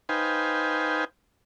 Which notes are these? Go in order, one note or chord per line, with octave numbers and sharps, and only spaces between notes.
D#4 B4 C5 F5 G5 G#5